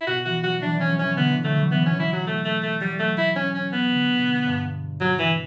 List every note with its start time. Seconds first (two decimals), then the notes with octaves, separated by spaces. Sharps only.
0.01 E4
0.07 B2 F#4
0.25 E3 F#4
0.43 F#3 F#4
0.62 E3 D4
0.75 E3
0.80 C#4
0.89 F#3
0.99 E3 C#4
1.16 D3 B3
1.31 E3
1.44 F#3 A3
1.58 E3
1.71 E3 B3
1.83 F#3 C#4
1.93 E3
2.00 E4
2.13 F#3
2.27 A3
2.45 A3
2.63 A3
2.81 F#3 G3
2.99 A3
3.18 E4
3.36 C#4
3.54 C#4
3.72 B3
3.92 D3
4.18 B2
4.46 G2
5.01 F#3
5.19 E3